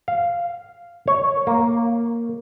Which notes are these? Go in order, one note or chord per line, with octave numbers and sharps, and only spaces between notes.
F5
C#5
A#3